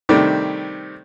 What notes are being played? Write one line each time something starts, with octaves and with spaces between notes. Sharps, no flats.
C3 D#3 G3 A3 D4